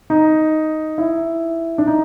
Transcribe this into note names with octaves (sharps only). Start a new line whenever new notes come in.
D#4
E4
D4
D#4